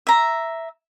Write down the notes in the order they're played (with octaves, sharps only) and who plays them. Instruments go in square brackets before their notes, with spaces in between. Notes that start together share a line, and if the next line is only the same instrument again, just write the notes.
[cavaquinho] E5 A#5